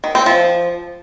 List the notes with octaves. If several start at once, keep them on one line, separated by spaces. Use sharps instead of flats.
D#3
C4
F3